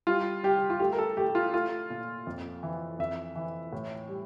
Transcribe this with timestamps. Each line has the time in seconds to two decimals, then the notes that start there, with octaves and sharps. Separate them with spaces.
0.07 G3 F4
0.43 G3 G4
0.70 F4
0.79 A3 G4
0.93 A#4
0.98 A4
1.17 A3 G4
1.35 F4
1.53 A3 F4
1.90 A#2
2.27 F2
2.63 E3
2.99 F2 E5
3.35 E3
3.73 A2
4.09 G3